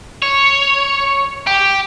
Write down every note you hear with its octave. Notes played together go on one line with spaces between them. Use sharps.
C#5
G4